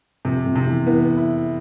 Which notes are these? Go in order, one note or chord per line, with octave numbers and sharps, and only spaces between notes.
F2 C3
F2
C3
E2
E2 B3
E4